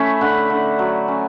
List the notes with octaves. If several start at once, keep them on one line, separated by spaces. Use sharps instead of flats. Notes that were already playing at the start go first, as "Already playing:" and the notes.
Already playing: E3 A3 C#4 E4 E5
D3 F#5
D3
F#3
C#4